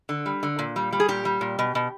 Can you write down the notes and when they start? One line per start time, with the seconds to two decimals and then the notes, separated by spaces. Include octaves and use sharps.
0.09 D3
0.26 G3
0.43 D3
0.59 A#2
0.76 G3
0.92 G3
1.00 G#4
1.08 A#2 G4
1.25 G3
1.41 A#2
1.59 B2
1.75 B2